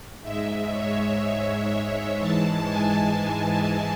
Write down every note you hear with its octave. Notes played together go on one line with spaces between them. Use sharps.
G#2 G#3 E5
C#5
C#5
E5
G#2 E3 G#3 A5
G#5
A5